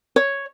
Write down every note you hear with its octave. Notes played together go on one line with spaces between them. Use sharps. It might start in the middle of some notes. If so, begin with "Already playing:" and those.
C#5